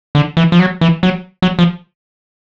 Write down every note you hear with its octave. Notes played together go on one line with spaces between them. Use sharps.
D3
E3
F3
F#3
E3
F#3
F#3
F3